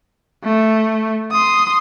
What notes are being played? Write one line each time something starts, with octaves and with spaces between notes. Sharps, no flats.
A3
C6 D#6